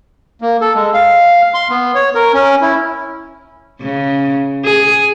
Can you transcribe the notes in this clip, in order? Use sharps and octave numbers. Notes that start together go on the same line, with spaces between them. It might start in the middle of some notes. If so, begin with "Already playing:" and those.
A#3
A4
G#3
F5
C6
B3
C#5
A#4
C#4
E4
C#3
G#4